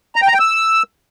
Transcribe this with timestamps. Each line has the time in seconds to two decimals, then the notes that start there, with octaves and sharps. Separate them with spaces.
0.16 A#5
0.22 G5
0.28 A#5
0.34 G5
0.40 E6